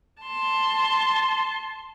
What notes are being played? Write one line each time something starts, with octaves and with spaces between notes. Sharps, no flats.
A5 C6